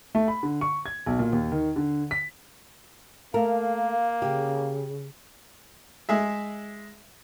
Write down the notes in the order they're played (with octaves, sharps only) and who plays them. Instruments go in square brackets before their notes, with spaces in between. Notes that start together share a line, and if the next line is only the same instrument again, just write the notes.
[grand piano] A3
B5
D3
C#6
G#6
B1
A#2
D#2
D#3
D3
B6
[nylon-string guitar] A3 A#4 [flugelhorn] A#3 [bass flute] F5
[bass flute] C#3 [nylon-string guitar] G4
[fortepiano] G#3 G#4 E5